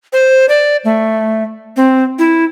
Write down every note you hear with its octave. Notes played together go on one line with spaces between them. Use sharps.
C5
D5
A3
C4
E4